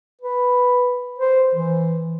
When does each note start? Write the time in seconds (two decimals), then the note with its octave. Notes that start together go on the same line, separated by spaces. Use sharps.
0.21 B4
1.18 C5
1.55 E3